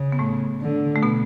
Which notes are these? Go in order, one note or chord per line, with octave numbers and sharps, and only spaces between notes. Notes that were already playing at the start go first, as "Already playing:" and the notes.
Already playing: C#3
B3
A2 A3
D3
A3
B2 B3